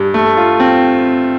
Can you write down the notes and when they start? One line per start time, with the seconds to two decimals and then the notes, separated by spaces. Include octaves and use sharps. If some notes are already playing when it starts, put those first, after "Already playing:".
Already playing: G2
0.14 A3
0.37 F4
0.60 C4